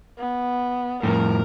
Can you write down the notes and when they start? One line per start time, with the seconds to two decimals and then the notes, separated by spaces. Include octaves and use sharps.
0.18 B3
1.03 F2 A2 A#4